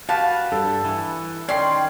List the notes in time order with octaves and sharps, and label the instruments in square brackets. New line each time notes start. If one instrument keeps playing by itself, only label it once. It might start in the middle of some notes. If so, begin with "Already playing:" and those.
[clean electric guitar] F#4 G4 B4 [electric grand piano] F5 [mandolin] A5
[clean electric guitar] G2 [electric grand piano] A4
[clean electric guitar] E3
[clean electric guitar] D#3 C#4 [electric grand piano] D5 C7 [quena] G5 [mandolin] C6